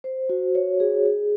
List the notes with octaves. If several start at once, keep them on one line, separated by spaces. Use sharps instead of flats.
C5
F#4
C#5
G#4
G#4